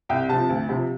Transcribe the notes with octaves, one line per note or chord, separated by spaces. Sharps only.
C2 G5
C3 F3 A5
D2
C3 F3